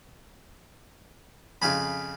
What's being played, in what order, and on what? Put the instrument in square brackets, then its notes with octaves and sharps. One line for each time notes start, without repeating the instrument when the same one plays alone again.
[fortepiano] F2 C#3 [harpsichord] F5 G#5 B5